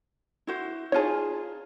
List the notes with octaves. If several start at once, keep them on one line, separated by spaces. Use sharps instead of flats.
E4 F#4 C5
D#4 F4 G#4 C#5 A5